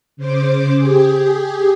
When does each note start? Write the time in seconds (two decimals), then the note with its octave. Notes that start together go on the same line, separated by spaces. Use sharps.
0.17 C#3 C5 D6
0.77 G4 G#4